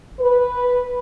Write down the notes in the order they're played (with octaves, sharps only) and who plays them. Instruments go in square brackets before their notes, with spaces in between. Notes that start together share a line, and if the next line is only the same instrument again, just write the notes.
[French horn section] B4